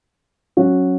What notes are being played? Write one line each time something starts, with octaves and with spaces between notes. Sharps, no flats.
F#3 C#4 F#4